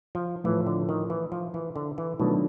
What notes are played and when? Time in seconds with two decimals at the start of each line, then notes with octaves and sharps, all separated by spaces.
0.15 F3
0.44 A2 E3 F3 A3
0.66 D3
0.89 D#3
1.10 E3
1.32 F3
1.54 E3
1.76 D3
1.98 E3
2.19 B2 D#3 F#3 A3 D4 F4